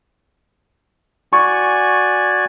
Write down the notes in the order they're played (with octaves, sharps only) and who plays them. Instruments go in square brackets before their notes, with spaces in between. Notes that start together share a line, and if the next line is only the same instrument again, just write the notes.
[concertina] F#4 D5 G#5 [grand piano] C#6